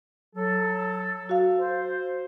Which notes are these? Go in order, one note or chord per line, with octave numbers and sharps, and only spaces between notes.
F#3 A4
F#4 F5
C5